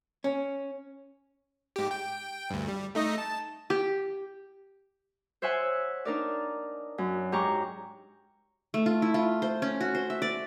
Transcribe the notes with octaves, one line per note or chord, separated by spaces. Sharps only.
C#4
G#2 G4
G5
D2 G2
G3
A3 D#4 D#5
A5
G4
C5 C#5 E5 F#5 G#5
D4 D#4 A#4 D5
F#2
G#2 G4 A#5 C#6 D6
A3
F4
E4
F4
C5
C#4
F#4
C5
E5
D5